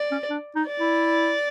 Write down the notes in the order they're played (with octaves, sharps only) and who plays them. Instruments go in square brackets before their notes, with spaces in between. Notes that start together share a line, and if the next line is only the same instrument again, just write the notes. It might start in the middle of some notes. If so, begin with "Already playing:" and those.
Already playing: [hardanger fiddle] D5
[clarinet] C#4
D4
D#4
[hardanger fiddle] D5
[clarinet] E4